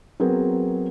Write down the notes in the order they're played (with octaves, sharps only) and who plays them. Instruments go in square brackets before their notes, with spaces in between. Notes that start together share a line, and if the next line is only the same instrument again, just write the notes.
[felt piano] F#3 B3 C4 G#4 A#4